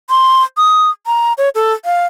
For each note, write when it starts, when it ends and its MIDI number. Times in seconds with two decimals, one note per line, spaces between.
0.10 0.43 84
0.57 0.90 87
1.06 1.33 82
1.38 1.49 73
1.55 1.73 69
1.85 2.06 77